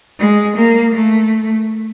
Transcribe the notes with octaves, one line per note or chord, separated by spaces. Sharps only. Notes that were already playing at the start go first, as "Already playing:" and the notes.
G#3
A#3
A3